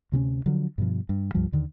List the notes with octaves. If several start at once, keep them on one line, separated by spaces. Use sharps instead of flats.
D2 C3 C4 C#4
D3 F3 F#3
G2 B2 F3
G2
C#2 G2 F3 G3
D#2 D3 D#3